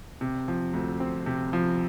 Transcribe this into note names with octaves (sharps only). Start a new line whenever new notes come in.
C3
F3
D2
C4
C3
F3